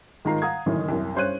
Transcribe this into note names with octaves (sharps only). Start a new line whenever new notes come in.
G#2 D#3 F4 A#5 C7
F5 F#5 A#5 D#6 G#6
F#1 F#2 A2 D#3 E3
C2 F#2
G2 C#4 C5 C#5 F#6 D#7